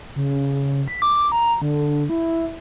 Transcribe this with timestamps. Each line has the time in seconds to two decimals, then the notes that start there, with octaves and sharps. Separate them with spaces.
0.16 C#3
0.88 B6
1.02 D6
1.32 A#5
1.62 D3
2.10 E4